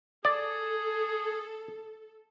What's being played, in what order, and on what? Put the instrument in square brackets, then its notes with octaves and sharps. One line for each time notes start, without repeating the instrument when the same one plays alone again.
[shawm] G#4 [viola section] A4 [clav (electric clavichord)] D5